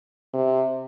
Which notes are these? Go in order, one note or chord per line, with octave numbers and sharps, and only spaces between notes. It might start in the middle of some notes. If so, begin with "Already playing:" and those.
C3